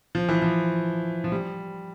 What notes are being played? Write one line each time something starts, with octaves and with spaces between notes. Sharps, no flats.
F3
E3
F3
F3
G3